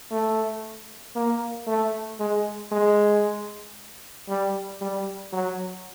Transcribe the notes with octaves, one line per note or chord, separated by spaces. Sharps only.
A3
A#3
A3
G#3
G#3
G3
G3
F#3